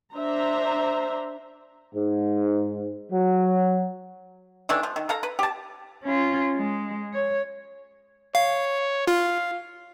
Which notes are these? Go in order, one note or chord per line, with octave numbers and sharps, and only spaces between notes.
D4 C5 E5 A#5
G#2
F#3
D#3 E3 A3 D4
F3
D#3
A4 F5 A#5
B4
G4 A5
C#4 F4
G#3
C#5
C#5 F5
F4 F5